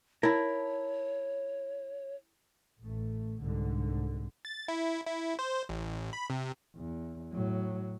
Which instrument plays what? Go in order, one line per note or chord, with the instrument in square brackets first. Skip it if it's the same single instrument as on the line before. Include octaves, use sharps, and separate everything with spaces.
[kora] E4 [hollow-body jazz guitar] A#4 A5 [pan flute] C#5
[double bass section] A1 A3
C2 G#2 D3
[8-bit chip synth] A6
E4
E4
C5
A1
B5
C3
[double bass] E2
A2 F#3